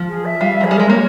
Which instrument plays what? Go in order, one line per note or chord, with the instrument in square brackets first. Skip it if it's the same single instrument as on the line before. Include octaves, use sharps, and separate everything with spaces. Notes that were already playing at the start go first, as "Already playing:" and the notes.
Already playing: [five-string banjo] F3
[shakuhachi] G#4
E5
[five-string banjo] G3 [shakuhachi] F5
[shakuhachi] E5
[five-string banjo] F3 [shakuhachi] G#4
[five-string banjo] G3
[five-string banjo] G#3 [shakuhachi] A#4
[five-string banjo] A#3 [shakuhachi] C#5